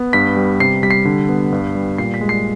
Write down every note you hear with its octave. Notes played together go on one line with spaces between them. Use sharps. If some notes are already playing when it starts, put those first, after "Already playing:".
Already playing: B3
G2 B6
G3
C3 C7
G3 B6
C7
D3
B3
G2
G3
A#2 C7
B6
G#3
C7